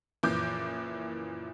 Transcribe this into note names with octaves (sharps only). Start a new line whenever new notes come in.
F#1 A#2 E3 F3 D6 G6